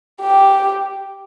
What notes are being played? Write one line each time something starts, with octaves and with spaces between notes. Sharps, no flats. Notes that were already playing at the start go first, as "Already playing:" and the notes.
G4